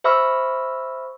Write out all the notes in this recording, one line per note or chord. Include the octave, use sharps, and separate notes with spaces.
C5 E5 B5 C#6 E6 F6